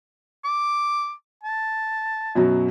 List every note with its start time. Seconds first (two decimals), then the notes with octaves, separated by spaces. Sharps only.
0.45 D6
1.43 A5
2.35 F#2 B2 F#3